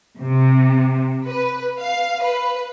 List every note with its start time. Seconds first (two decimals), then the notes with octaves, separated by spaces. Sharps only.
0.20 C3
1.26 B4
1.80 F5
2.22 B4